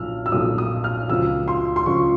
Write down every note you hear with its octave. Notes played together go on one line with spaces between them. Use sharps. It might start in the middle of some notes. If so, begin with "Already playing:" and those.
Already playing: B1 A#2 F3 E6 F6
E6
B1 A#2 F3 D#6
D#6
F6
C#2 C#3 F3 E6
C6
C6
C#2 C#3 F3 C#6